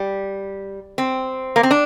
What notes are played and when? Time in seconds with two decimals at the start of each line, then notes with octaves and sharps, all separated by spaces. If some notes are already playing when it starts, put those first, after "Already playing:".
Already playing: G3
0.98 C4
1.56 A#3
1.63 C4
1.71 D4